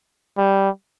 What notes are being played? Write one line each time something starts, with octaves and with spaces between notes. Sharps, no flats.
G3